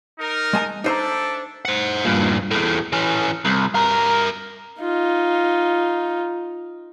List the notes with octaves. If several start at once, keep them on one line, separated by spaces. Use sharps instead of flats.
D#4 A#4
G#3 G#5 A5
D4 D#4 A4 C5 E5 A#5
C5 F#5
G2 A#2
E2 A2
E3 C#4
C2
G2 A#4
D#4 F4